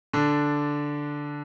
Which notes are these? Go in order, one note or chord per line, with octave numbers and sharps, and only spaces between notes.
D3 D4